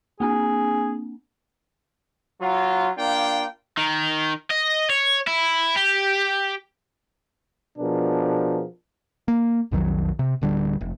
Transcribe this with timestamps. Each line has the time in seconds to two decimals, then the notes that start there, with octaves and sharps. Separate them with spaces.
0.20 A#3 C4 D4 G#4
2.40 F#3 F4
2.97 A#3 D4 F4 G5
3.78 D#3
4.51 D#5
4.90 C#5
5.27 E4
5.76 G4
7.78 B2 F3 D4 G#4 A#4
9.28 A#3
9.72 B1 F2 D#3 F#3
10.19 C3
10.41 D1 D3 G3
10.81 F1